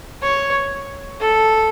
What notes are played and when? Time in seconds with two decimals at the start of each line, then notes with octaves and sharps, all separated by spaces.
0.22 C#5
1.21 A4